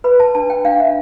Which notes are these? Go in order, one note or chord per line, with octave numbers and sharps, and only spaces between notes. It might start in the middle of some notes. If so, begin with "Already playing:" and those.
B4 B5
A5
D4 A5
G5
D4 F5
E5